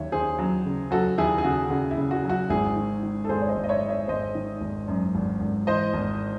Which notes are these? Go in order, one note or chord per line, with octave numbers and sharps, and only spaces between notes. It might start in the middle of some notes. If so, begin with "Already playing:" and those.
Already playing: D#2 F#3 C#5 E5
D#2 G#4 C5
F#3
C#3
F#3 F#4 A4
D#2 E4 G#4
G#4
C#3 F#4
C#3 F#4
E4
C#3
F#4
F#3
F#4
G#1 E4 G#4
D#3
D#3
A4
G#1 G#4 C5
C#5
C5 D#5
G#1
D#5
C#5 E5
G#1
C#5 E5
G#1 C5 D#5
D#3
G#1
F#2
G#1
G#1
E3 C5 D#5
G#1